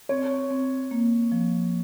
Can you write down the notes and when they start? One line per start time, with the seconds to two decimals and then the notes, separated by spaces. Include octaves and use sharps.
0.09 C4 C#5
0.51 C4
0.91 A#3
1.32 F3